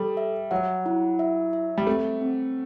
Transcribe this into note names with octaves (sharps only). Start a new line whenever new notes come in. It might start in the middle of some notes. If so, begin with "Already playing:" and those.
Already playing: G3 A4
E5
F#3 F#5
E4
E5
E5
G3
A3 C4
C4